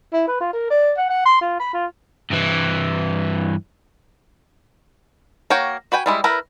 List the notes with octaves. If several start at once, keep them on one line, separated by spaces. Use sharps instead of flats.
E4
B4
F4
A#4
D5
F#5
F#5
C6
F4
B5
F4
G2 E3
A#3 F#4 C#5 G5
F#4 B4 G5 G#5
G3 G#3 E4
E4 A#4 B4